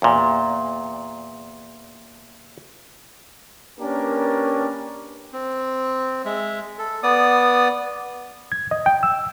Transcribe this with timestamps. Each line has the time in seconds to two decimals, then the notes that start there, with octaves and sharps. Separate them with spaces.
0.02 E2 A#2
3.80 A#3 C#4 D4 G4 A#4 B4
5.33 C4
6.25 G#3 E5
6.79 A4
7.03 B3 D5 D#6
8.52 G#6
8.71 D#5
8.86 G5
9.03 E6